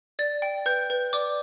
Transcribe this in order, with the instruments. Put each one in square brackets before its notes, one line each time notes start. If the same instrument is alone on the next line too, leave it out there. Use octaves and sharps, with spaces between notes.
[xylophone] D5 A6
G5
B4 G6
B4
D5 D6